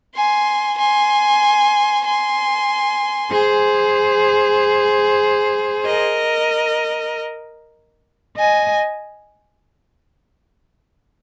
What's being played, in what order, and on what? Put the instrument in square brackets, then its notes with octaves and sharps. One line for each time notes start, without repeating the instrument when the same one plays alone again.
[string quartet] G#5 C6
G#5 C6
G#5 C6
G#4 C5
A#4 D#5
D#5 G#5